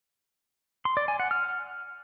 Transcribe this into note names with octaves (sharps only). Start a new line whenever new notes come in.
C6
D5
G#5
F#5
F6